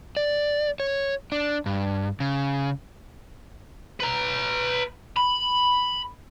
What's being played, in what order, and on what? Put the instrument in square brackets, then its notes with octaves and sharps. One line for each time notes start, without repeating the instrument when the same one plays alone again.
[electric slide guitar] D5
C#5
D4
G2
C#3
[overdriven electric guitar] B4 A#5
B5